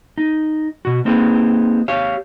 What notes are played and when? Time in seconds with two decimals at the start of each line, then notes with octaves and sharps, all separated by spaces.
0.18 D#4
0.85 B2 F#4
1.05 A#3 C4 D#4 G4 G#4 B4
1.88 G4 C#5 F5